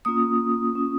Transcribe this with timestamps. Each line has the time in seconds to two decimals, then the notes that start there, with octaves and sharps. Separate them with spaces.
0.05 A#3 C#4 F4 D#6
0.73 A#3 C#4 F4